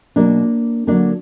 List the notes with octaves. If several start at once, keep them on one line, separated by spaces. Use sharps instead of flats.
B2 F#3 A#3 D4
D3 F#3 A#3 D4